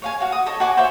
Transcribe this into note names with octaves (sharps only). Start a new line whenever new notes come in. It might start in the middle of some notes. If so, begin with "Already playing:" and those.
C#5 F5 G#5
F#4 F5
D#6
A4 C#5 D#5
F#4 F#5 G#5 D6
C5 C#5 E5 F5